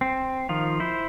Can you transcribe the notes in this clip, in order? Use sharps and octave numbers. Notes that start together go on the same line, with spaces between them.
C4
D#3 F3 F4
E4 C5